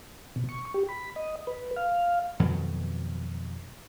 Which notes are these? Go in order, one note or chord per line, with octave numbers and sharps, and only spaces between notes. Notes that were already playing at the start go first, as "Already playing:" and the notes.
B2
C#6
G4
B5
D#5
B4
F5
F2 B2 D#3 F#3